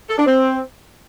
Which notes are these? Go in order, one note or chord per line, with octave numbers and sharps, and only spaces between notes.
A4
D4
C4